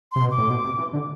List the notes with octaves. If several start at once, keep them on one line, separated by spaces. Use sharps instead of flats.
C3 C6
B2
D6
A2
B2
C3
E3
D3